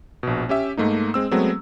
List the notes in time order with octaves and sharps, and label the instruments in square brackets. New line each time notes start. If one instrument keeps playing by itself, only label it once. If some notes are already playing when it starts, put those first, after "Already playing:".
[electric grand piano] A#1 B2
C#4 G4 E5
G#2 A3 A#3 D#4
G#3 C4 E6
F#3 G#3 A3 B3 C4